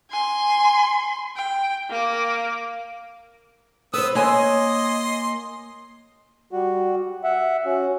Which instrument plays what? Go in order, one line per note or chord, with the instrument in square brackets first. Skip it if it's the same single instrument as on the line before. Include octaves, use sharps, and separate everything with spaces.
[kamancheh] G#5 C6
G5
A#3 D6
[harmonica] B3 D#6 E6 [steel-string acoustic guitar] B4 C5
[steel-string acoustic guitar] A#3 C#5 G#5 [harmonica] D#5 C6
[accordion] G3 F#4
E5 F#5
C#4 F#4